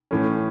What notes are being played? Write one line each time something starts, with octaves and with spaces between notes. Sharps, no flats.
A2 E3 A3 C#4